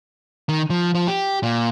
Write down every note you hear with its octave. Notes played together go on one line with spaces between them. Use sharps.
D#3
F3
F3
G4
A#2